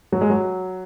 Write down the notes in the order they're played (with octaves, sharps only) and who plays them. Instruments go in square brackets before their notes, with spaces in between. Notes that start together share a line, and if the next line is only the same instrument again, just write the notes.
[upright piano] F#3
G#3
F#3